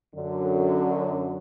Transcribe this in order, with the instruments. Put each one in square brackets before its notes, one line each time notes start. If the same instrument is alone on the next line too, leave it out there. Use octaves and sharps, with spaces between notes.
[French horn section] F#2 D3 F#3